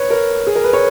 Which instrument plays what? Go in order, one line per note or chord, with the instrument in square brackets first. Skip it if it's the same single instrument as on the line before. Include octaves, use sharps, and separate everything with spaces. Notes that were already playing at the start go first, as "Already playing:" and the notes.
Already playing: [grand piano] B4 C#5
A#4
G#4
A#4
B4
C#5